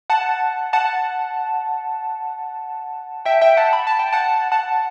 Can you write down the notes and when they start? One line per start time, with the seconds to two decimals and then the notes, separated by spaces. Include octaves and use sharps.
0.10 F#5 A5
0.73 F#5 A5
3.25 E5 G5
3.41 E5 G5
3.57 F#5 A5
3.73 B5
3.87 A5
3.99 G5
4.12 F#5 A5
4.52 F#5 A5